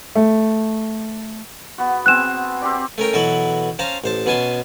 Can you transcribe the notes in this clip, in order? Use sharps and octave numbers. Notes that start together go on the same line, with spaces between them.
A3
B3 F#4
B3 C4 G#5 F#6 E7
C4 G4 D5
A3 C#4 A#4 G5
B2 E3 F#3 E4 F#4 A4
C#4 C5 F5 A5 A#5
A1 C5 A5
B2 B3 C#4 G#5 A5 C6